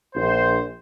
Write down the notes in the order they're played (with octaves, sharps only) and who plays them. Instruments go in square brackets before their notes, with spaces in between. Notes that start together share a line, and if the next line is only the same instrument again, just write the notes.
[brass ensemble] A#1 C5